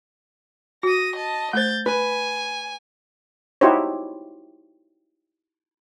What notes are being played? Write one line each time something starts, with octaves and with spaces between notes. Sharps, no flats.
F#4 D#6 A#6
D#5 A5
A3 C5 G6 A6
B4 G#5
D#4 E4 F#4 G4 C5 C#5